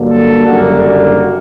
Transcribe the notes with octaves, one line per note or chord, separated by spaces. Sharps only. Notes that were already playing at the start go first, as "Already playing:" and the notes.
Already playing: G2 D3 F#3 A#3
A4
F#1 F#2 D3 G3 A#3 F#4
F#4